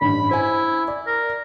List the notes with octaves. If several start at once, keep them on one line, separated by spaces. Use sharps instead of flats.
A1 G2 B5
E4 C5 G#5
D5
A#4